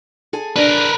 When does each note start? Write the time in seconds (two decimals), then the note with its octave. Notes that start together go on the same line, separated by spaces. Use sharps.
0.33 G#4 A4 G#5
0.56 D4 G#4 A#4 B4